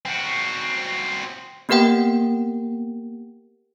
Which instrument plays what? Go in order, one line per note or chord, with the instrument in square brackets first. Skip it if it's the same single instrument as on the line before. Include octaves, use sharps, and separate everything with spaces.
[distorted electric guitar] C4 F#4
[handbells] A#3 B3 G4 A#4 F#5 G5